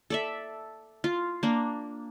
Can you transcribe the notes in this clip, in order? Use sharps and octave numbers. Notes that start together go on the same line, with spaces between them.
A4 D5 E5
F4
A#3 D4